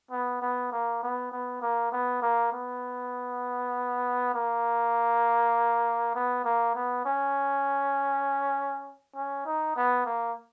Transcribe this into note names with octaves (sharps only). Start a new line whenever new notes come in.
B3
B3
A#3
B3
B3
A#3
B3
A#3
B3
A#3
B3
A#3
B3
C#4
C#4
D#4
B3
A#3